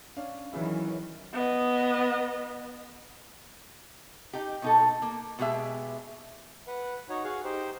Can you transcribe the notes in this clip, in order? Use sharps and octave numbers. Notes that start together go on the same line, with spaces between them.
C#4 D4 F5
D#3 E3 F#3 C#4 E4 G#4
B3 D#5
D#4 G4
B2 D#4 A4
A#3
B2 G#3 G4 G#4 E5
B4 F#5
D#4 F#4 C#5 F#5
F#4 G#4 F5 F#5
D#4 G4 C5